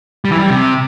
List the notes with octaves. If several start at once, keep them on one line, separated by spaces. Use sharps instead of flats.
G3
E3
G3
C3